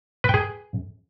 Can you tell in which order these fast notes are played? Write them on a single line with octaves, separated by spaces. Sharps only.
B4 G5 G#4